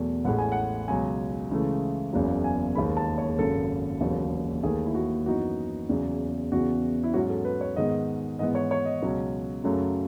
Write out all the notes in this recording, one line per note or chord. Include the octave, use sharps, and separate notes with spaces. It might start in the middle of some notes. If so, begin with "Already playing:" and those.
Already playing: E2 B2 F#3 A3
A1 A2 G#3 F#5
G#5
F#5
C#2 B2 F#3 G#5
C#2 C#3 E3 A3
F#1 E2 C#3 F#3
G#5
D#2 D#3 G#3 B3 B5
A5
C#5
G#4
G#1 F#2 C#3 A4
E1 D#2 C#3 F#3 B3
D#2 D#3 A3 G#4
E4
F#4
F#2 E3 B3 D#4 F#4
E2 C#3 F#3 C#4
E2 C#3 E3 B3 F#4
E4
G#2 F#3 C#4 F#4
A4
B4
C#5
G#2 D#3 G#3 B3 D#5
G#2 E3 B3 D#5
C#5
C#5
D#5
C#2 B2 F#3 C#4
F#2 C#3 F#3 A3